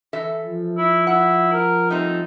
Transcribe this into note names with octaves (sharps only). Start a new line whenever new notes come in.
E3 A4 E5
F3
E4
E4 F#5
A#4
G3 A3 C4 D#4